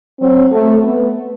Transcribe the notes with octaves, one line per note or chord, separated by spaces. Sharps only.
F#3 C4
A3
B3